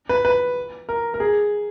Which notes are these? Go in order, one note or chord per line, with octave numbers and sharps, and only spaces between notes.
B4
B4
A#4
A#4
G#4